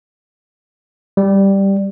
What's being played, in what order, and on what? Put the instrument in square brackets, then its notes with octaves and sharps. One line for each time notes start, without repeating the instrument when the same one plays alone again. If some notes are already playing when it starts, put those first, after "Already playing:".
[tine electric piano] G3